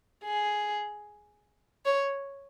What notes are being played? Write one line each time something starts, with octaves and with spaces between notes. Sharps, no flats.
G#4
C#5